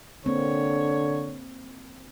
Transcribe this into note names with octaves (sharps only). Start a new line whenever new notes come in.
D3 A#3 C4 C#5